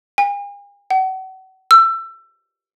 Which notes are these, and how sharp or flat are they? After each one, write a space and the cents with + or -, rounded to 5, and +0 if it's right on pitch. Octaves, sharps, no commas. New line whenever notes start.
G#5 -45
F#5 +35
E6 +25